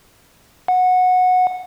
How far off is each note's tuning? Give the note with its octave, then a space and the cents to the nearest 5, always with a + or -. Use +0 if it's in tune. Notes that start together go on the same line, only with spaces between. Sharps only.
F#5 -15